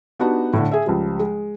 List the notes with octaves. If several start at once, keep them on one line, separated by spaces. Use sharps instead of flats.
B3 D4 D#4 F#4 G4 F#5
A2 D3
G#4 E5
C#2 F3 G3
G#3